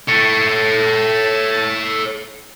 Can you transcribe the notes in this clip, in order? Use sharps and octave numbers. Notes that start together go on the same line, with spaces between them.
A4 C#5